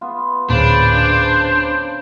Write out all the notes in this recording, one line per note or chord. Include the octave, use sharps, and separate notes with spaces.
B3 F4
D1 A#2 C#3 D4 B4 C5 B5